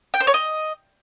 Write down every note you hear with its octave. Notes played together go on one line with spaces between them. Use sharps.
G5
C5
C#5
D#5